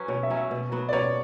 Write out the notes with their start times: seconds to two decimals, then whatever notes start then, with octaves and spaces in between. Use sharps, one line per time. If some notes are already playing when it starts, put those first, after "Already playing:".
Already playing: F#3 C#4 B4
0.08 B2 C#5
0.23 E5
0.30 F#3 C#4
0.37 E5
0.51 B2
0.72 F#3 B3
0.89 D5
0.93 B2 C#5